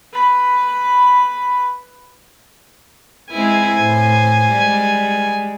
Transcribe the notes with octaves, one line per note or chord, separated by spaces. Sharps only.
B4 B5
G#3 C4 E4 G#5
A2 C5
G3 G#3